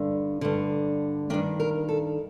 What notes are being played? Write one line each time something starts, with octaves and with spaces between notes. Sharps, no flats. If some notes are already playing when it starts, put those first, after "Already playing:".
Already playing: G2 D3
G2 D3
G2 D#3 D4
A#4
A4